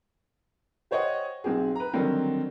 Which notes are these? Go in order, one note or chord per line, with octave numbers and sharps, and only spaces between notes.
G4 C5 C#5 D#5 F#5
B1 C4 G4 G#4
B4 A#5
D3 D#3 F#3 G3 C4